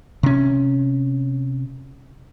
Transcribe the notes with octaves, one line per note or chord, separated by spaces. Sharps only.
C3 C#4